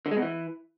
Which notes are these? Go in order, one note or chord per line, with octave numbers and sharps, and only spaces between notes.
D3
G#3
B2
E3